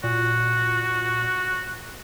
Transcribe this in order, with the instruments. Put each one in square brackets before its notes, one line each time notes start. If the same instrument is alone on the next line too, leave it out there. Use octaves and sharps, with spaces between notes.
[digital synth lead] A#2 [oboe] F#4